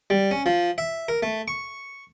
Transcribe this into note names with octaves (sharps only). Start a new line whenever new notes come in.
G3
C#4
F3
E5
A#4
A3
C#6